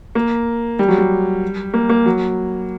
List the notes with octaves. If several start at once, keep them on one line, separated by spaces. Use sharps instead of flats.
A#3
G3
F#3
G3
A#3
A#3
F#3